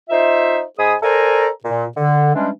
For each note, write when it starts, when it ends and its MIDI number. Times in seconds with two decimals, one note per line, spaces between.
0.10 0.62 63
0.10 0.62 65
0.10 0.62 72
0.10 0.62 76
0.78 0.95 44
0.78 0.95 68
0.78 0.95 80
0.78 0.95 83
0.78 0.95 87
1.03 1.49 69
1.03 1.49 70
1.03 1.49 72
1.03 1.49 74
1.03 1.49 80
1.03 1.49 82
1.64 1.86 46
1.97 2.34 50
2.35 2.50 52
2.35 2.50 55
2.35 2.50 56
2.35 2.50 61
2.35 2.50 62